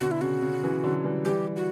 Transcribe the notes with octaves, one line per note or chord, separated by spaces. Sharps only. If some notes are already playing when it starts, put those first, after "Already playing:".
B2 D3 F#4
E4
C#3 F#4
C#3
C#3 E3
D3 F#3
E3 G3
E3 G3 G4
F#4